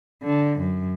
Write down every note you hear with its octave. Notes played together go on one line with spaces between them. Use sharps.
D3
F#2